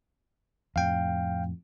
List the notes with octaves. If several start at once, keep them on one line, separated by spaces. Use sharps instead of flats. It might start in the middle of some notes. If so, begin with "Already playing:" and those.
F2 A2 F5 G5